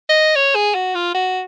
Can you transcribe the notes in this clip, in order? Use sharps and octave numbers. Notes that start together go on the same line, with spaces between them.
D#5
C#5
G#4
F#4
F4
F#4